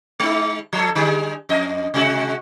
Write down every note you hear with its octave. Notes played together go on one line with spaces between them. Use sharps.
G#3 D#4
F3 A4
D3 G3 G#4
F2 D#5
C3 G#3 F#4